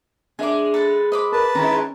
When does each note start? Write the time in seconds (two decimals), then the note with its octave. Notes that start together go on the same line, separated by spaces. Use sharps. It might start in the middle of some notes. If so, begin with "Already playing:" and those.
0.39 G#3 D4 E5 G#5 D6
0.74 A4 B4 A5
1.12 C5 D#5 B5 D6
1.32 A#4 B4 A5
1.55 D#3 G#3 C#4 E4 A#5